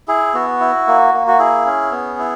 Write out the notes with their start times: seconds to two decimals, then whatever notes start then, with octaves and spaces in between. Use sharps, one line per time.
0.08 E4 G#4
0.34 B3 F#4
0.60 E4
0.87 A#3
1.14 A#3
1.27 F#4
1.39 E4 G#4
1.66 C#4
1.92 B3
2.19 E4